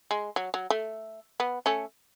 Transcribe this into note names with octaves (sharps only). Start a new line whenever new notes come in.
G#3
F#3
F#3
A3
B3
A3 C#4